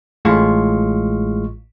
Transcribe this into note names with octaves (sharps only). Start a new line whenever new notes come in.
A1 A2 G#3 F4 F5 C#6